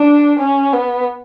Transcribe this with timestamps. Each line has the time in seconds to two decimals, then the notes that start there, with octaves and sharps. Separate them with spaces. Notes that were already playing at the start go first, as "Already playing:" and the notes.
Already playing: D4
0.39 C#4
0.73 B3